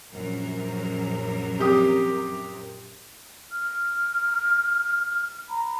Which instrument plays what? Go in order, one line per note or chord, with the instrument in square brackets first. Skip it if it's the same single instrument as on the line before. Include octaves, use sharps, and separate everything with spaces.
[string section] A#1 F#2 A#4
[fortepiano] C3 G4 D#6
[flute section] F6
A#5 B5